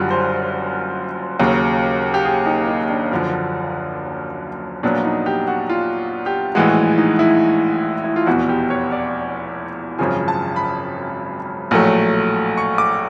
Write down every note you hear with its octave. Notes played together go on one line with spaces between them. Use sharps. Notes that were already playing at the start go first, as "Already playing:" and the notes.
Already playing: F#1 F#2 D3 G3 F4 F#4
C5
D#2 C#3 F#3
G4
G#4
D#4
D#4
D4
F#1 F#2 D3 F3
A#1 A#2 F#3 B3 D4
D#4
G4
F#4
F4
G4
A#1 A2 E3 G#3 F#4
D#4
E4
E4
F4
F1 E2 B2 F#4
G4
C#5
D5
G#1 F#2 C#3 F3 G#5
A5
B5
A#1 A2 F#3 A3
C#6
D6